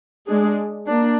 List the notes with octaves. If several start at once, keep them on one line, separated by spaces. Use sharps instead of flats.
G#3 D4 G#4
A#3 D4